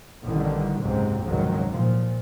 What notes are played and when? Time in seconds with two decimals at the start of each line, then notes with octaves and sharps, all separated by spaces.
0.23 A1 D3 D#3 G3
0.81 F#1 C#2 G#2 C3 F#3 C4
1.23 F1 C#2 G#2 D#3 F#3
1.68 A#2 F3